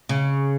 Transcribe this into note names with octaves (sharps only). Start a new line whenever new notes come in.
C#3